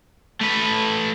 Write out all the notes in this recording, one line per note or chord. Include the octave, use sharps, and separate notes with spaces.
A3 B4